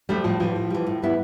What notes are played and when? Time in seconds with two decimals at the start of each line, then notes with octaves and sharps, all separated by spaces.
0.09 F3 G3 A3 D4 A4
0.24 A2 F3
0.40 E3 F3 G3
0.56 A2
0.70 E3 G3
0.87 A2
1.02 G3 B3 E4